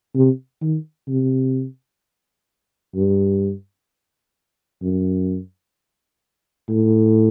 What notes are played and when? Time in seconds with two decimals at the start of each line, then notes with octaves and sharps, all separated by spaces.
0.15 C3
0.62 D#3
1.08 C3
2.95 G2
4.82 F#2
6.69 A2